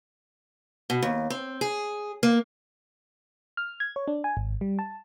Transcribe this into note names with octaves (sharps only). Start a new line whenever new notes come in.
B2
D#2
C4
G#4
A#3
F6
G#6
C#5
D4
G#5
G#1
G3
A5